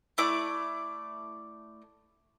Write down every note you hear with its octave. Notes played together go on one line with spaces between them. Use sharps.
A3 E4 D5 D6